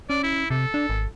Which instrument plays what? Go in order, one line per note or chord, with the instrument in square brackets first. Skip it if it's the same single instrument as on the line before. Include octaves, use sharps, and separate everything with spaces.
[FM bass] C#4 [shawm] D5
[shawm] E4
[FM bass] C3 [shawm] A4
[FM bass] D4
G#1